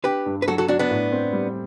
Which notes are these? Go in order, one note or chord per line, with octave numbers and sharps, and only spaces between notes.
D4 G4 B4
G2
B4
F#3 F#4 A4
F#4 A4
F#3 D4 F#4
B3 D4
A2
C4
G3